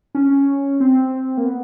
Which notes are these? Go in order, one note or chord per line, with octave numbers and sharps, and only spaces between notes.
C#4
C4
A#3
B3